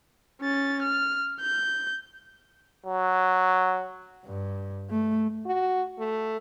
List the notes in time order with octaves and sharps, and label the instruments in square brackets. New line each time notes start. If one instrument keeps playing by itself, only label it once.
[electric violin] C#4 A6
F6
G6
[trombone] F#3
[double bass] G2
A3
[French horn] F#4
A3